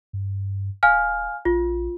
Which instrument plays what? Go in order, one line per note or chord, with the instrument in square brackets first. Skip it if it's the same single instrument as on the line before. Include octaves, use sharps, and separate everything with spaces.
[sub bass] G2
[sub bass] D#1 [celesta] F5 G#5 F6
[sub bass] A#1 [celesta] F4